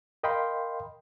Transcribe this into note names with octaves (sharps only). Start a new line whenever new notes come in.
A#4 D#5 F5 G5 B5 C6